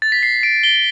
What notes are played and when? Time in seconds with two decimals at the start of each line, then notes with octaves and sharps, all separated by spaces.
0.02 A6
0.12 B6
0.23 C7
0.43 D7
0.63 G7